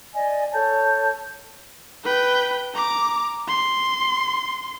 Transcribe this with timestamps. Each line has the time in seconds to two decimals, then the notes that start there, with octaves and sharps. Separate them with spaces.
0.13 D5 D#5 G#5
0.52 A4 C#5 A5 G6
2.04 B4 G5
2.75 A#5 D6
3.48 C6